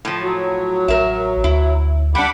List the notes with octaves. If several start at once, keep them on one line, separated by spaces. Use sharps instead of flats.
A2 F3
F#3
A1 A#4 E5
D2 E4
G3 D4 F#5 B5 D6